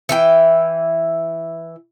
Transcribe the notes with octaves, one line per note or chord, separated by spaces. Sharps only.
E3 E4 G5